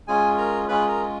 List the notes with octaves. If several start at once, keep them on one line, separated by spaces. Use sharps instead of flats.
G#3 C#4 F4 G#4 G#5
A#4 A#5
G#3 C#4 F4 G#4 B4 B5
A#4 A#5